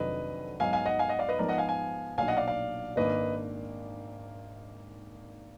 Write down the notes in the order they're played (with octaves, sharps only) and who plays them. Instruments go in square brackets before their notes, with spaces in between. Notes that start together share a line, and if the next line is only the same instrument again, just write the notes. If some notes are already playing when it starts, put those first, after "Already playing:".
Already playing: [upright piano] F1 F2 D#3 F#3 D4 [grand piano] B4 D#5
[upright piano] G#2 F#3 B3 D#4 [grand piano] F5 G#5
[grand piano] F5 G#5
D#5 F#5
F5 G#5
D#5 F#5
D5 F5
B4 D#5
[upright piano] G#2 F3 B3 D#4 [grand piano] A#4 D5
[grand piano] D#5 F#5
F5 G#5
F5 G#5
[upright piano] B1 A#2 F#3 D4 [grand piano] F5 G#5
[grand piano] D#5 F#5
D5 F5
D5 F5
[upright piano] G#1 G#2 D#3 A#3 D4 [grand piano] B4 D#5